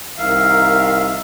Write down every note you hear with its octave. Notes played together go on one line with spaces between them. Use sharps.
C2 D#3 A#4 E5 F5